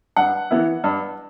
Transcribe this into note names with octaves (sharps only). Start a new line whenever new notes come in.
G2 F#5
E3 B3 E4
G2